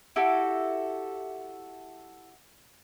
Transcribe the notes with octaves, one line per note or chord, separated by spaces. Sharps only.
E4 F#4 G4 A4